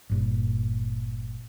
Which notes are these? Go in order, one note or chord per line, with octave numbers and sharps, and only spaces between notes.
G1 G2 A#2